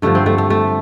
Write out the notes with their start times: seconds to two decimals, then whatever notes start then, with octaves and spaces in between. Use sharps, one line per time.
0.02 G2 D3 F3 A3
0.15 C4
0.26 A3
0.38 A3
0.50 A3